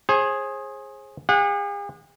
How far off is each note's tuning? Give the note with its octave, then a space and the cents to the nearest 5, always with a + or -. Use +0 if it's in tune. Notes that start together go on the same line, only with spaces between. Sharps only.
G#4 +0 C5 +40
G#4 -45 F#5 -30